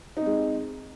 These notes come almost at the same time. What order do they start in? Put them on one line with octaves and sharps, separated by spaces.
D#4 C4 G#3